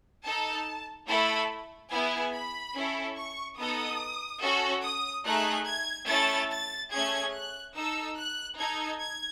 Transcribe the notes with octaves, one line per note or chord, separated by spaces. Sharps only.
D#4 A4 A5
A3 E4 A4 B5
B3 E4 G#4 G#5
B5
C#4 E4 A4
C#6
B3 D#4 A4 D#6
C#4 F#4 A4
D#6
A3 D#4 G#4 F#6
G#6
A3 C#4 E4 A4 A6
A6
A3 C#4 G#4 G#6
F#6
D#4 A4 E6
F#6
D#4 A4 G#6
G#6